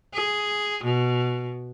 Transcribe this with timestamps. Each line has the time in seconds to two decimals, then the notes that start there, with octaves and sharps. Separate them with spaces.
0.14 G#4
0.84 B2